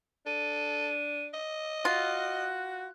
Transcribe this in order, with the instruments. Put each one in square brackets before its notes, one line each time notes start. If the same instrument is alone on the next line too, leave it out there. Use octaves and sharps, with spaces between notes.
[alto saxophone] D4 [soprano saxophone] A4 [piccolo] D#7
[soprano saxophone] D#5
[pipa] F4 [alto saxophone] F#4 [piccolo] F#6